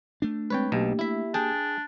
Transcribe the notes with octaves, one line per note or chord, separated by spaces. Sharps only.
A3 D4
G#3 C4 B4 C#5 G5
B1 B2 A#3 G4
E4 E5
D4 G#4 G5 A5